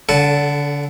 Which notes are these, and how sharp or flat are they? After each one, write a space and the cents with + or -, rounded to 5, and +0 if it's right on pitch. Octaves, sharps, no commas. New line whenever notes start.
D3 -35 A4 +0 F#5 +0